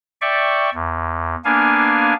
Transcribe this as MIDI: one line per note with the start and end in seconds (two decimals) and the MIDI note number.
0.21 0.70 74
0.21 0.70 76
0.21 0.70 79
0.21 0.70 85
0.74 1.36 40
1.45 2.14 58
1.45 2.14 59
1.45 2.14 62
1.45 2.14 77
1.45 2.14 80